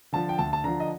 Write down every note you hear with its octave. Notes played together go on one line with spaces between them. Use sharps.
D3 F3 A5
G5
D2 A5
A5
D3 F3 A#5
D#5